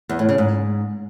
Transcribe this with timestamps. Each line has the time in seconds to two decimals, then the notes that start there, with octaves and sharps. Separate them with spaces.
0.09 E2
0.19 A2
0.29 C#3
0.38 G#2